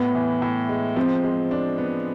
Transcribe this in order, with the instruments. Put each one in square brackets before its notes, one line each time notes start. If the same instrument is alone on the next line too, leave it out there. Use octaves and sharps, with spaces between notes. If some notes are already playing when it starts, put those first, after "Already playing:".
Already playing: [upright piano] A2 [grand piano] B3
[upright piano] E3
A2
G#3
[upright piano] F3 [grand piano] C4
[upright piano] G#3
D4
B3